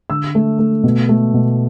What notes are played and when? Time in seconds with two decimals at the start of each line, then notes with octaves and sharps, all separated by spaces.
0.10 D3 E6
0.35 A3
0.59 A3
0.83 B2
1.09 A3
1.34 B2